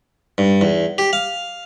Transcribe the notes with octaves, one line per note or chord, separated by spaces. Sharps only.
G2
E2
G4
F5